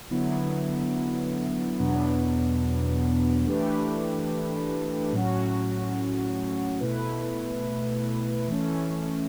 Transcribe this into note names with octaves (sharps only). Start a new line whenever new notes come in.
D3 F#3 B3 E4
E2 B2 F#3 B3 D4
E3 A3 D4 G4 B4
A2 F#3 C#4 F#4
B2 A3 E4 B4
E3 A3 C#4